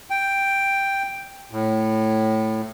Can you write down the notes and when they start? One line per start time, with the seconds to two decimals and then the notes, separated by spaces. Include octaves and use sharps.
0.10 G5
1.51 A2